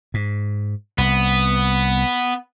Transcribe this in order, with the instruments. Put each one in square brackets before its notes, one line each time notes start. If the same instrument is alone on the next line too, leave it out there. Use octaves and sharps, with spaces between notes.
[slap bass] G#2
[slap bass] C2 [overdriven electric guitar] B3